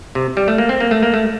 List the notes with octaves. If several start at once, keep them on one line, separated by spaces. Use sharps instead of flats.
C3
G3
A3
A#3
C4
A#3
A3
A#3
A3